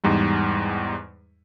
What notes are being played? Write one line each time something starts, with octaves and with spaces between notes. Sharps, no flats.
E2 G#2 G3 D#4